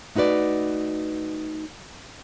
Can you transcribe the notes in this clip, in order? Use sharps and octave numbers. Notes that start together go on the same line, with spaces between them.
A3 D#4 F#4 B4 D5